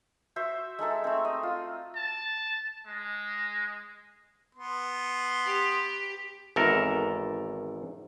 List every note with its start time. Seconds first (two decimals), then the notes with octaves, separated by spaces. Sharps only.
0.36 F#4 C5 E5
0.79 G#3 D#4 A4 E5
1.04 A3 C4
1.25 D#5
1.43 F4
1.96 A5
2.86 G#3
4.55 B3 C6
5.46 G4
6.56 G#1 E2 A4 A#4